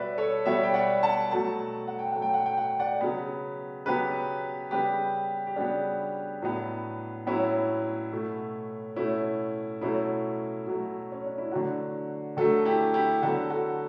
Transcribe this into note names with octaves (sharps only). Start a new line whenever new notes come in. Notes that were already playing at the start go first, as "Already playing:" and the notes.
Already playing: B2 G3 B3 B4 C#5 D5 E5
A4 C#5
B2 G3 B3 C#5 E5
G5
D5 F#5
F#5 A5
B2 F#3 A3 F#5 A5
F#5
G5
B2 F#3 A3 F#5
G5
F#5
G5
F#5
G5
D5 F#5
C#3 F#3 B3
C#3 F#3 B3 G4 B4
C#3 G3 B3 G4 B4
G4
C#3 G3 B3 D4 F#4
A2 F#3 B3
A2 F#3 B3 C#4 E4
B2 A3
B2 A3 C#4 E4
B2 F#3 A3 C#4 E4
B2 F#3 A3
C#4
D4
E4
D3 F#3 A3 D4 F#4
D3 F#3 A3 F#4 A4
E4 G4
E4 G4
D3 F#3 B3 F#4 A4
F#4 A4